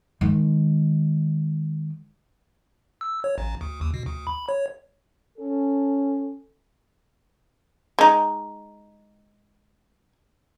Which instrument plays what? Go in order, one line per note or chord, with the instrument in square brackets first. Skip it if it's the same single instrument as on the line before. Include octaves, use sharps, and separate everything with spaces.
[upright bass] D#3 G#3
[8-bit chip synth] E6
C#5
A1
D2
D#2
B2
D2
B5
C#5
[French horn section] C#4 A4
[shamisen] G#3 D#4